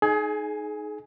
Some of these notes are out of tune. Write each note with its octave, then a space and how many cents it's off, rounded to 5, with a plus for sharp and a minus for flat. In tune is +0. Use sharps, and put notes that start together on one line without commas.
D#4 +0 G#4 +30 G#5 +0